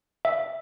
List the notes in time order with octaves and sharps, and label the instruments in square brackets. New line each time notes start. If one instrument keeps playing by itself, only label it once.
[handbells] E5